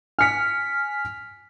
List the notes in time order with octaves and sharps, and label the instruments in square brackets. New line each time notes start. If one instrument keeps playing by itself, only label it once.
[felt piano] G#5 C#7 [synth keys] F6 B6